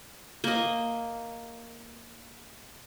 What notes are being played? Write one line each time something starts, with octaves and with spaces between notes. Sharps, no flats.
A#3 D#5